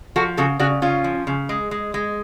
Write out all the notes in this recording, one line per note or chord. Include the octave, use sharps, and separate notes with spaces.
F3 F#4 A4
C#3 F#4 A4
C#3 D4 F#4
C#3 C#4 F4
F3
C#3
G#3
G#3
G#3